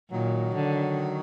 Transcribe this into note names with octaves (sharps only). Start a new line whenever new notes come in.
A#2 D#3 F#3
D3